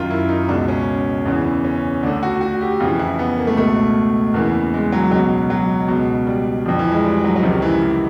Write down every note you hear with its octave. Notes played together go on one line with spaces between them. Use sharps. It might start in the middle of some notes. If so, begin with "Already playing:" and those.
Already playing: F#2 D#3 F4
E4
D#4
C#2 B2 D4
C#4
E2 C#3 E3
C#4
D2 D3 D4
F#4
F#4
G4
F2 C#3 E3 F4
E4
B3
A#3
A3
C#2 B2 A3
E2 C#3 E3 A#3
G#3
F#3
C#2 B2 F#3
F#3
C#2 B2
G3
F2 D3 F3
E3
G#3
G3
F#3
F#3
C#2 C3 D#3 F3
E3
E3